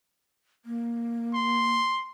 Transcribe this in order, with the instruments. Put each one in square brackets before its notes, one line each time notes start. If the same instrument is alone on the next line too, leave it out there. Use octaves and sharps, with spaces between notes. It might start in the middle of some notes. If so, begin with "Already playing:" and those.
[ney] A#3
[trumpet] C6